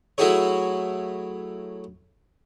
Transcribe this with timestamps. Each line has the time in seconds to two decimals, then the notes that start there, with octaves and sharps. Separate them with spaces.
0.18 F#3 A3 E4 F#4 G#4 C#5